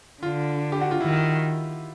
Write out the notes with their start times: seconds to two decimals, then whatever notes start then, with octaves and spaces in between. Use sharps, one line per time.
0.22 D3 F4
0.72 G4
0.81 F#4
0.91 F4
1.01 D#3 E4